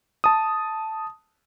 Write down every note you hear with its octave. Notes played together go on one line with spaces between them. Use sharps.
A5 D#6